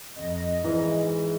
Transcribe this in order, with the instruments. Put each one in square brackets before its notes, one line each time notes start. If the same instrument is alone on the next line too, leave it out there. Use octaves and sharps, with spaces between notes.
[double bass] F2 [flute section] D#5
[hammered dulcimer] G#2 [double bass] E3 [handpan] E4 B4 D5